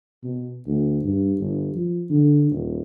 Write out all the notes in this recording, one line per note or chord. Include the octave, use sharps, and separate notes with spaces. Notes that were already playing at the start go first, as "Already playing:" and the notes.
B2
D2
G2
G1
F3
D3
D#1